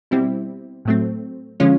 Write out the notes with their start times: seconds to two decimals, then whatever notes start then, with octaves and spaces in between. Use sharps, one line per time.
0.11 B2 G3 C4 E4
0.85 A2 F#3 A3 C4
1.60 D3 F3 G#3 C#4 F4